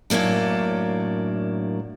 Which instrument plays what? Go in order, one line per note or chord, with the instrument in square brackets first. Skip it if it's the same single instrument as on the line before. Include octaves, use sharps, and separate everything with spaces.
[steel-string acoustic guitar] F#2 A2 F#3 A#3 D4